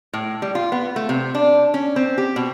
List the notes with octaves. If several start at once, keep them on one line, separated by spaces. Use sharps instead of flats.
A2
G3
F4
B3
A3
C3
D4
C#4
C4
G4
B2